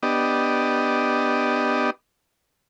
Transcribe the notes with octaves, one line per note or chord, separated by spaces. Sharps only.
B3 D4 G4 D#5